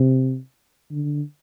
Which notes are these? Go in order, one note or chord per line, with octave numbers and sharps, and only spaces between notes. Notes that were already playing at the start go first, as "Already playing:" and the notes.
Already playing: C3
D3